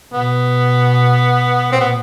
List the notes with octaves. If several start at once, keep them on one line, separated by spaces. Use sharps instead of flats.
B2 B3
A#2 C4
B3